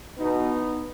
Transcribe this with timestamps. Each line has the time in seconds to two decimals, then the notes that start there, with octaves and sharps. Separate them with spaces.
0.18 E2 B2 B3 D#4